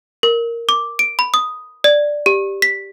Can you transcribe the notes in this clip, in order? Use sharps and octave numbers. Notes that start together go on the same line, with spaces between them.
A#4
D6
D7
B5
D#6
D5
G4
B6